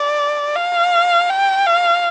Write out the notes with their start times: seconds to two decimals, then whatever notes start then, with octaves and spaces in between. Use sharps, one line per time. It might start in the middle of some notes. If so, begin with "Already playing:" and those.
Already playing: D5
0.56 F5
1.30 G5
1.66 F5